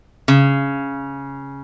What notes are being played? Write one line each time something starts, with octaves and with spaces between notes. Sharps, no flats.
C#3